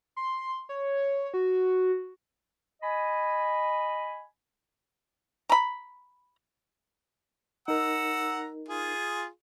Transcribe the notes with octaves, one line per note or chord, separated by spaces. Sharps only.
C6
C#5
F#4
D#5 G#5 B5
A#5 B5
D#4 A#4 F#5 A#5 E6
F4 G#4